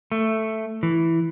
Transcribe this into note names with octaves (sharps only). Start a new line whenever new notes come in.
A3
E3